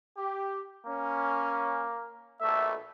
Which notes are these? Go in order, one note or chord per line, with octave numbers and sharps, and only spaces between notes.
G4
A#3 C#4
A#1 B2 A3 E5